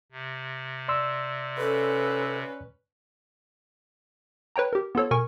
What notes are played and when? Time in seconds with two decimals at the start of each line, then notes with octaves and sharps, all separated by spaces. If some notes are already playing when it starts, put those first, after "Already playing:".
0.12 C3
0.88 D5 C6 E6
1.58 C#4 A4 B4
4.56 B4 C#5 G5 A#5
4.73 G4 A#4
4.95 B3 F4 A4 C#5
5.11 B2 A#4 G#5 C#6